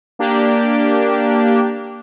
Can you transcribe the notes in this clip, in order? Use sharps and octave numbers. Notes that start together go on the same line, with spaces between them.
A#3 D4 G4